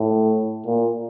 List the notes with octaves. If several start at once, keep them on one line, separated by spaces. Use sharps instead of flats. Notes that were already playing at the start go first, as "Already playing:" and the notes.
Already playing: A2
A#2